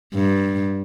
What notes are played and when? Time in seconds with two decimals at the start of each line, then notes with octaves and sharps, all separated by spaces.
0.14 G2